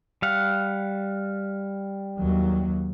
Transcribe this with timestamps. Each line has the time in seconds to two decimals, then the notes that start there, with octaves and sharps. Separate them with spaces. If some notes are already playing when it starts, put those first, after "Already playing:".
0.22 G3 F5 F#5
2.19 D#2 F#3